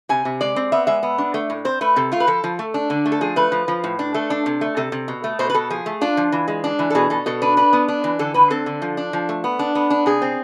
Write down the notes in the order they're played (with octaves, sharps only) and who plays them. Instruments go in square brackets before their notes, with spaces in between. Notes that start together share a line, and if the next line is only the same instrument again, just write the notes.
[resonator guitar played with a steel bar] C3 G#5
C3
G#3 D5
C4
B3 E5
G#3 E5
B3
D4
A3
A2
C4 C5
A3 B4
C3 A4
A3 F4
B4
F3 A4
F3
A3
D4
D3
A3
A4
F3 G#4
A3 B4
F3
F3
A2
D4
A3 A4
D4
C3
A3
C3 A4
C3
B2
A3
B2 C5
B4
B2 A4
F3 G#4
A3
D4 F4
F3
E3
G#3
D4
E3
A4
B2 G#4
B2 A4
B2 A4
D4 B4
D4 B4
B3
D4
E3
D3 A4
D3 B4
C4 A4
D3
F3
D4
F3
A3
B3
D4
B3
D4
C3 G#4
C4